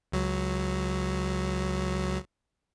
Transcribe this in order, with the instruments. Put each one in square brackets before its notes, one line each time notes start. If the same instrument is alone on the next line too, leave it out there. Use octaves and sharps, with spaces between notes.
[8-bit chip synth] C#2 F#3